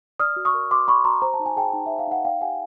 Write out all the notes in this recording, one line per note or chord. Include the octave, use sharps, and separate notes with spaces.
D5 D#6 F6
F#4
C#6 D#6
A#4
F#4 C6 D6
D5 B5 C#6
F#4 A#5 C6
C5 A#5
A5
D#4
G#5
G#4 G5 A5
D#4
C5 E5
F5
D#4 F#5
D5 F5 G5
G4 F#5 G#5